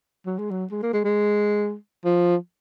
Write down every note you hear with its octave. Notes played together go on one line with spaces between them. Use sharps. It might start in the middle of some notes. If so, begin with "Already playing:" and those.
F#3
G#3
F#3
G#3
A#3
G#3
G#3
F3